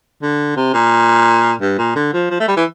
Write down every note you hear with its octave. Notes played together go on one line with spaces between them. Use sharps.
D3
C3
A#2
G2
A#2
D3
F3
F3
A3
G3
E3